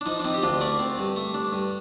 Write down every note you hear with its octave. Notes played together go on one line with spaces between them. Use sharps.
D4
F3 D#4
D4
C4 D#4
G4
D2 D4 F4
A3 A#4 D5
C4
G2
A3
D4
G2